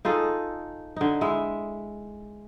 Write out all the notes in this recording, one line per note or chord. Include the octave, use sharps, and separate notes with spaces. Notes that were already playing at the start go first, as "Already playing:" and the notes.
D#4 F4 G#4 A4
D3 D#4
G#3 E4 E5